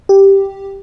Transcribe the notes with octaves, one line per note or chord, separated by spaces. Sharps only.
G4